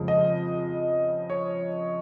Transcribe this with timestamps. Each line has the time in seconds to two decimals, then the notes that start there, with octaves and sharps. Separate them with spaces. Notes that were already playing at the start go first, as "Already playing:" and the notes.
Already playing: F2 C#3 F3 G#3
0.08 D#5
1.30 C#5